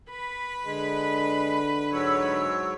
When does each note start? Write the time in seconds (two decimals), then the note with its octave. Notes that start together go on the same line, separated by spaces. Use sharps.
0.10 B4 B5
0.65 D3 G#3
1.92 G#2 F#3 C#5 E6